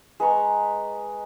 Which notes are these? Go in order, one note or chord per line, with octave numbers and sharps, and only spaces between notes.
G#3 B4 A#5 C#6